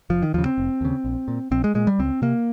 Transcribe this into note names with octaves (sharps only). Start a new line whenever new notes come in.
F1 F3
D#3
D#2 C#3 F3
C4
F1
D#2 C#3
A#1
A#2
A#1 C4
G#3
A#2 G#3
G3
C#2 C4
C3 A#3